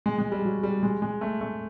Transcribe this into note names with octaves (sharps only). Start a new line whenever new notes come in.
G#3
G#3
G3
F#3
G3
G#3
G#3
A3
A3